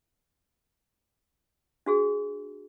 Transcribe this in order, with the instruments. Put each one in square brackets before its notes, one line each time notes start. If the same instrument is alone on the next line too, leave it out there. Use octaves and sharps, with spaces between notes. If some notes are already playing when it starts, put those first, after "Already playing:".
[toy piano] D4 F#4 G#4